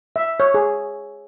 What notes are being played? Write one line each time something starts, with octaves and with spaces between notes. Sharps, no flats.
E5
C#5
G#4